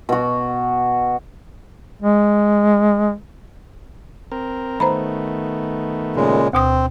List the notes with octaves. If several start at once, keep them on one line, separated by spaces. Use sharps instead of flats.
B2 F#4
G#3
C4 A#4
D#3 A3 B3 C5 A#5 B5
A#2 C#3 G#3
D2 B2 C4 D#6